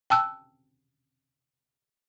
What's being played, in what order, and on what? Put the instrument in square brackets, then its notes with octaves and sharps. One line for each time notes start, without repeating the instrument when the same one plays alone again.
[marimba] G5 A5 E6 F#6